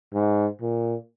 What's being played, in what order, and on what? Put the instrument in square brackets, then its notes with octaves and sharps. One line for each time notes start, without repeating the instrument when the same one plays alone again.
[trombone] G#2
A#2